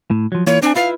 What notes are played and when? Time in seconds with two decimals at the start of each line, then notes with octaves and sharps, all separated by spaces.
0.11 A2
0.32 F3 F#3
0.47 E3 A#3 F4 C#5
0.62 C4 D4 G#5
0.76 E4 F4 B4 F5